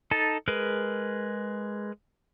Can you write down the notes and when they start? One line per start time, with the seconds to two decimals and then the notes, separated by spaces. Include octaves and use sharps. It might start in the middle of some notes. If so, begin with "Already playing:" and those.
0.11 D#4 A4 A5
0.48 G#3 G#4 A#4 B4